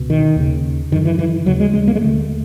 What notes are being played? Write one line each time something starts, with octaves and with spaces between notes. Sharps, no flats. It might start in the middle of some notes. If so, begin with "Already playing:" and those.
Already playing: C#2 B2
D#3
D#2 C#3
F#2 D3 D#3
E3
E3
D#2 C#3 F#3
G#3
G#3
A#3
G#3
D#2 D3 A3